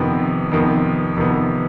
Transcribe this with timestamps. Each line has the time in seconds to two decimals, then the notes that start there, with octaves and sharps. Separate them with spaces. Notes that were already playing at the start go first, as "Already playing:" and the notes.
Already playing: F2 C3 D#3 B3
0.51 F2 C3 D#3 B3
1.16 F2 C3 D#3 B3